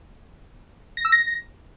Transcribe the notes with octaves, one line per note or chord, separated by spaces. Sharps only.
A#6
E6
A#6